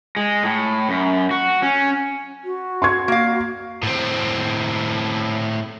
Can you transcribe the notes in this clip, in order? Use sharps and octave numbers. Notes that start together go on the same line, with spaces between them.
G#3
A2
F#2
F#4
C#4
F#4
C6 C#6 G#6
A#3 F5
A2 C4